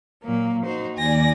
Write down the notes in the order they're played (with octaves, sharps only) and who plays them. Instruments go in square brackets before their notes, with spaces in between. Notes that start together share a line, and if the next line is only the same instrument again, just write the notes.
[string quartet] A#2 F#3 A#3
D#4 F#4 C5
[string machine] D#2 D5 [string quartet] G#5 A#6